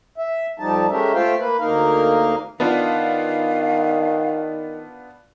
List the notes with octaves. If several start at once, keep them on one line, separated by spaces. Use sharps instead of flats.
E5
F2 F3 G3 D#4 A5
G#3 A3 C#4 G4 A#4 E5
A3 F4 C5 E5 F5 G5
A#3 B4
D2 A#3 D#4 A#4 F5
D#3 B3 D4 F4 F5